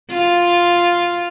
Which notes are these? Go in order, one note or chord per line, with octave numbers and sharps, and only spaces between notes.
F4